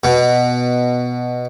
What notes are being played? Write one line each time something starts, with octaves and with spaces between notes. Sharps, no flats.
B2